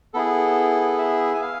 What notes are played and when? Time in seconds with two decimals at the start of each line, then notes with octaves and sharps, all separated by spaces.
0.14 B3 E4 G#4 A4
0.99 E5
1.34 G#5
1.42 F5